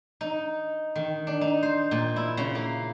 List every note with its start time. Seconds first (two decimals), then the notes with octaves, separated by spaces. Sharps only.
0.21 D#4
0.96 D#3
1.27 D4
1.41 D#4
1.63 C5
1.91 A#2
2.16 E4
2.37 C#3
2.55 A#3